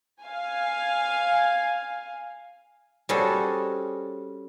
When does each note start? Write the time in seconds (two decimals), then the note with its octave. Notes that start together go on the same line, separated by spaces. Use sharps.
0.21 F5 G#5
3.09 G3 C4 C#4 F#4 G#4 A4